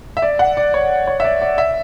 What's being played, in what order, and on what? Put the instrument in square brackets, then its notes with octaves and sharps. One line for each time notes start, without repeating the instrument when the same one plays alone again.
[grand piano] E5
D5
F#5
D5
C#5
C#5
E5
D5
D5
E5